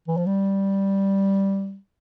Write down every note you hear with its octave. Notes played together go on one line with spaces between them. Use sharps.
E3
F3
G3